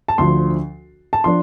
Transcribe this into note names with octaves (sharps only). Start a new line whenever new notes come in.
A5
D2 D3 F3 C6
A5
F3 D4 C6